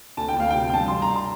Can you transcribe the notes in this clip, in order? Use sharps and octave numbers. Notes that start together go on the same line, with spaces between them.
D2 A5
G5
D2 F5
C3 G5
G5
G2 A5
G2 C6
A#5
C6